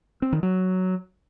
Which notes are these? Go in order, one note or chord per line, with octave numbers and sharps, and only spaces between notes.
C4
D#3
F#3